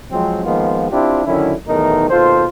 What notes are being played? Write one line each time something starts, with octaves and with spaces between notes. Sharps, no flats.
F3 F#3 G#3 C4
D#3 F3 G#3 A#3 B3 F4
C4 D4 E4 F4 G4
D3 D#3 F#3 C#4 E4
B1 E2 D#3 A3 D#4 A#4
D#2 B2 F4 A4 C5